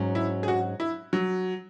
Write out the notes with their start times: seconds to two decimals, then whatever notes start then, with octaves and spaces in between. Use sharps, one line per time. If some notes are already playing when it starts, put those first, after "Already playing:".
Already playing: G#2 F#3 C#4
0.15 E4
0.43 G#4
0.48 F#4
0.80 E4
1.13 F#3